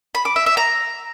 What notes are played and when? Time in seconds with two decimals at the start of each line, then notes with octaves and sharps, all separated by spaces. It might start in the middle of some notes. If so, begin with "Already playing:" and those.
0.15 B5
0.25 D6
0.36 E5
0.46 E5
0.57 A#5